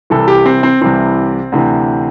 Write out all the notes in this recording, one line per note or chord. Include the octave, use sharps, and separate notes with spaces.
C2 C3 E3 A4
G4
C4
C4
C2 C3 E3 C4
D2 C3 E3